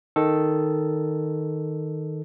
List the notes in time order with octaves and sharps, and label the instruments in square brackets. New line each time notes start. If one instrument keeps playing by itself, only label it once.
[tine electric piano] D#3 A4